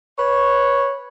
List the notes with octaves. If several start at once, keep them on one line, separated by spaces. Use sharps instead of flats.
B4 C#5